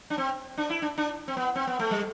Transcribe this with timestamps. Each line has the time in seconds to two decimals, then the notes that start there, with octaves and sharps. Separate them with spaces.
0.10 D4
0.18 C4
0.58 D4
0.70 E4
0.82 D4
0.98 D4
1.28 C4
1.37 B3
1.56 C4
1.67 B3
1.79 A3
1.91 G3